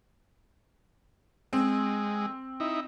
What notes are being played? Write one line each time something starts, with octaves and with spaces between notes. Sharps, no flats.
G#3 C4
D#4 E4